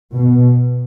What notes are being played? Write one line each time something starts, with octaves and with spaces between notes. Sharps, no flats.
B2